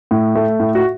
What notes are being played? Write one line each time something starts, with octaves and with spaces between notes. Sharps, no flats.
A2
A3
A2
F#4